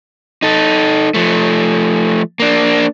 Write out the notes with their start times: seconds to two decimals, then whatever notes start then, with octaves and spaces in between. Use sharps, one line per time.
0.42 D#4 A4
1.14 F3 A3
2.40 A#3 D4